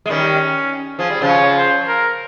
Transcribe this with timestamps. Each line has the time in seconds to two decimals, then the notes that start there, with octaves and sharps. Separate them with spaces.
0.06 G#3
0.10 D#3 G3 C#4
0.99 F3 G#4
1.10 G3
1.21 C#3 F3
1.29 C#5
1.58 C5
1.88 A#4